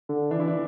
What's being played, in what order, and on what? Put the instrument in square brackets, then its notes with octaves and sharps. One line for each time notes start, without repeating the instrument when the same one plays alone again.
[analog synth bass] D3
[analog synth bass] E3 [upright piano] D4
[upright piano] E4
D4